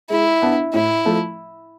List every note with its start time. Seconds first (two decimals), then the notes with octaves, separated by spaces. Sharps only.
0.10 G#3 E4
0.42 B3 D4
0.73 A2 E4
1.05 F3 A3